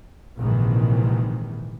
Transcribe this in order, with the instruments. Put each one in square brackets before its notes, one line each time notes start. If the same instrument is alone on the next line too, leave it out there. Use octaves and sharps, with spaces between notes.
[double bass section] A#1 G#2 C3 D#3 E3